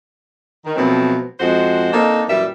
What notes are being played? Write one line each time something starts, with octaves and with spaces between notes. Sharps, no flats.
D#3
B2 F3 F#3 A3 C4
F2 G#3 F#4 C5 F#5
A#3 C4 D4 D#4 A4
F#2 A#2 E3 G3 E5